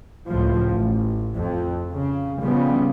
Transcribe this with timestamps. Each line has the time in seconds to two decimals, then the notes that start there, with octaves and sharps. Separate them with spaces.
0.27 C#2 A2 F3
0.69 A1
1.36 F2
1.93 C#3
2.43 C#3 F3 G3 B3